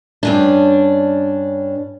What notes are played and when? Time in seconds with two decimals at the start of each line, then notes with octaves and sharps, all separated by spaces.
0.23 G2 C#4 D4